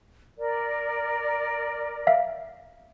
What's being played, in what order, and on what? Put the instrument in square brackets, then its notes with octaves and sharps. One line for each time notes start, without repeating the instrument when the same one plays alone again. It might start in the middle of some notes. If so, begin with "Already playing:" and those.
[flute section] A#4 D5
[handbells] E5 F5